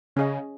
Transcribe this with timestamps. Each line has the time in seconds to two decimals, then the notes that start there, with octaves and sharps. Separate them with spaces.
0.16 C#3 C#4 G#4 D#5